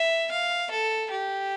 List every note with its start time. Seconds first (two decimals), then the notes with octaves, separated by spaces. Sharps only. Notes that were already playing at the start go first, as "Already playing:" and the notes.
Already playing: E5
0.31 F5
0.71 A4
1.11 G4